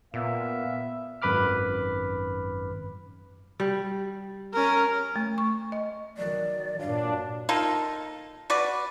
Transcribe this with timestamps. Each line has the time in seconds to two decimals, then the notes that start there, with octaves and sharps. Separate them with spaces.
0.14 A#2 B3 E5 F5
1.22 G#1 F#2 B4 B5 D6 F6
3.60 G3
4.54 C#4 A#4
5.16 A3
5.38 C#6
5.72 D#5
6.17 D#3 F#3 D5
6.79 G2 A#2 D4 F#4 C#5 D5 F5
7.49 A#3 D#4 F4 A4
8.50 F#4 B4 D5